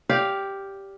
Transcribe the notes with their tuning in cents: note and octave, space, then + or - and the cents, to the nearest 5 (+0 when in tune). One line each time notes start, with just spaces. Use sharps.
G4 +0 D5 -30 F5 +0